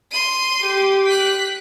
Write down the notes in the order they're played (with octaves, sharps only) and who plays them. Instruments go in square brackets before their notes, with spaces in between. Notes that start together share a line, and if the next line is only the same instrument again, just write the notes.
[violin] C6 D#7
[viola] G4
[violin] F#6 B6